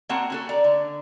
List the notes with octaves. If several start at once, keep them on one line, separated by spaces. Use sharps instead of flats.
A#3 C4 F#4 F#5 A5
C#4 F#4 A4
D5 A#5
D3